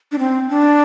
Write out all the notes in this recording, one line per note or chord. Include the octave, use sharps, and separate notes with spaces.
D4
C4
D4